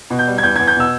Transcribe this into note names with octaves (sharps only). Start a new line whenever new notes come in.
B2
G6
G3
G#6
E2 G6
G#6
E2
G6
B2 E6